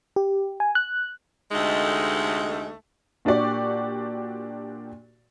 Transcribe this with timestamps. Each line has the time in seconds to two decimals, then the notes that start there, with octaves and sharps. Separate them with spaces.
0.16 G4
0.60 G#5
0.75 F#6
1.51 D2 C3 G#3 A3 D#4
3.25 A#2 D4 F#4 G4 D5 C#6